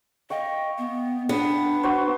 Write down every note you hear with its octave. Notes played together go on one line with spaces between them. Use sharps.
D#5 F5 G5 C#6
B3
B3 D4
F#4 C5